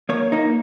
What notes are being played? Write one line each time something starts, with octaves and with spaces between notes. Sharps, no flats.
A#3 C#5
A#3 D#4